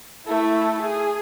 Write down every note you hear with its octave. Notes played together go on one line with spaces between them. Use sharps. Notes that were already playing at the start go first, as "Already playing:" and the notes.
A3 E4
G#4